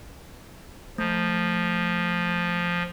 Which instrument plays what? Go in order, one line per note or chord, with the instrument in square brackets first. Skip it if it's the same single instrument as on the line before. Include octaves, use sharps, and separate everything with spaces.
[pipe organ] F3 [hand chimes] A3